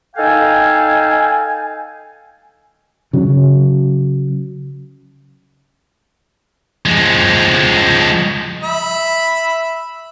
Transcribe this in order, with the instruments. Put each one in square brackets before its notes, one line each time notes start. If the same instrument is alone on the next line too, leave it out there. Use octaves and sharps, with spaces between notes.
[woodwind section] D#4 A4 F5 G5 G#5
[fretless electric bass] C#3 F#3
[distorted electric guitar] F3 G#3
[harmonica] E5 B5